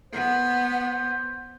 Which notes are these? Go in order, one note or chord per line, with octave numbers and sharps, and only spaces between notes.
B3 C5